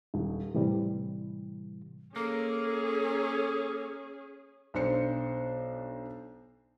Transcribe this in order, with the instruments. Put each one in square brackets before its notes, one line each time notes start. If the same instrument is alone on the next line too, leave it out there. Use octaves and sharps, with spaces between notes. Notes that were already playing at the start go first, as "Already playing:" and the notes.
[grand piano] D#1
[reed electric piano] A2 C3 E3 G3
[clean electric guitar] A#3 [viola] C#4 G#4 [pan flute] A4
[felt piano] B1 D4 C5 C#7